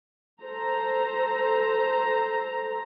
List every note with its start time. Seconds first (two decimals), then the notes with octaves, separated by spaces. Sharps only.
0.41 A4 C5 A#5